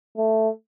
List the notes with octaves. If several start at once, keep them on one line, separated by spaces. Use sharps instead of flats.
A3